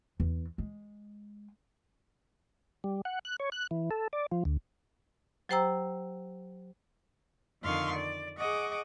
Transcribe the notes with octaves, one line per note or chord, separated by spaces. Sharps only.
E2
G#3
G3
F#5
F#6
C#5
F#6
E3
A4
D5
F3
D2
F#3 G4 C5 G5 A#5 E6
F2 D3 D#3 F5 C6 C#6
D5
G#4 D#5 F#5 C#6 D6